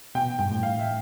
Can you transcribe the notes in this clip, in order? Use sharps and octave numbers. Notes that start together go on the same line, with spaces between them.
B2 G5
G2 G5
A2
F5
E5